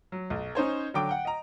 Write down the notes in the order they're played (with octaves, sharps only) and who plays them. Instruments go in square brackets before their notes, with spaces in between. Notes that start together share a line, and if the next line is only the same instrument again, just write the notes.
[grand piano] F#3
B1
C#4 D#4 C5 C#5
D3 F#3 G5 D6 D7
F#5 G5
D#5 A#5